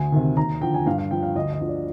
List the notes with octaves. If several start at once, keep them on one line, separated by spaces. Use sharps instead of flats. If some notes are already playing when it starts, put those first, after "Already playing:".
Already playing: D2 G#5
C3 D#3
D#2 A#5
D3 F3 G5
G#5
G2 F5
F5
F3 G5
F5
D2 D#5
D#5
D3 F3
D5